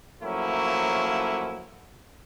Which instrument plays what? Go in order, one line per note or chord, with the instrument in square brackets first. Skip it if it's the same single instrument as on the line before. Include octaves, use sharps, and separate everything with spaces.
[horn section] F3 F#3 A3 A#3 C#4 E4